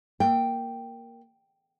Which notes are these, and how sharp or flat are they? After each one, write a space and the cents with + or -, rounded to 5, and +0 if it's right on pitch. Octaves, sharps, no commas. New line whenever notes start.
A#3 +0 G5 +0